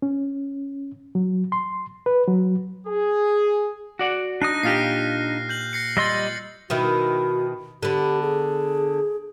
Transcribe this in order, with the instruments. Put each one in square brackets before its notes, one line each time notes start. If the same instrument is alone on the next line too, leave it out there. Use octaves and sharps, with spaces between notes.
[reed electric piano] C#4
F#3
C6
B4
F#3
[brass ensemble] G#4
[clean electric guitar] F#4 D5 F#5
[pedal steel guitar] D4 D#4 D#6 [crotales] F#6 A#6
[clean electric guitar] A#2 F4 G4 [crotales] F6 C7
[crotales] G6 F#7
A#6 C7 C#7
[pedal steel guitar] G3 D#5 C6 [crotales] E6 A6
[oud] B2 D#3 E4 [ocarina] F#4
[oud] D3 B3 [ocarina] G4
[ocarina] G#4